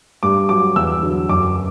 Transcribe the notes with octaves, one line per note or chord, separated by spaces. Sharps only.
G2 D6
F#3 D6
E2 E6
D3 F#3
F#2 D6